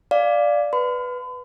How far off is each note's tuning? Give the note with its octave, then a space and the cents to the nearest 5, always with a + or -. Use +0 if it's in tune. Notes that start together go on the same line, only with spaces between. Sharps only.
D5 +0 F5 +0
B4 +0 B5 +45